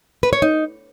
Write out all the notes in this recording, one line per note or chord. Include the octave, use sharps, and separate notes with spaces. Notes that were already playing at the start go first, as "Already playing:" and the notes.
B4
C#5
D#4